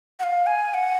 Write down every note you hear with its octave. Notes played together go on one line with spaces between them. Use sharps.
F#5
F5
G#5
F#5